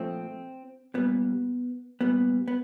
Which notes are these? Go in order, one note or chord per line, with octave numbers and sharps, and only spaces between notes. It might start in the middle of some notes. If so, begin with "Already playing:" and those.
Already playing: A#2 F3 A3 C4
A#2 G3 B3
A#2 G3 B3
B3